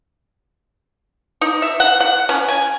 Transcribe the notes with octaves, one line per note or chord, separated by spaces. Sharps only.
D#4
E5
F#5
F#5
C#4
G#5